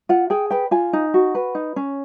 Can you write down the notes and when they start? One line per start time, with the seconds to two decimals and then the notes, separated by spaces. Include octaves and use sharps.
0.09 F4 F#5
0.30 G#4 G5
0.51 B4 G5
0.71 F4 G#5
0.93 D#4
1.14 F#4
1.35 B4
1.55 D#4
1.76 C#4